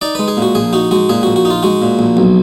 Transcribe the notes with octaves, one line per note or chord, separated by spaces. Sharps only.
D#4 D5
G#3 B4
G#4
A#2 F#4
A#1 G#4
D#4 F#4
G#3 F#4
A#2 G#4
A#1 F#4
F#4
D#4
F4
G#3 F#4
A#2
A#1
B1